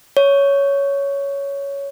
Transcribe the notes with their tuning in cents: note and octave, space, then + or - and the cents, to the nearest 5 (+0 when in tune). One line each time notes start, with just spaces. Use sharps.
C#5 +10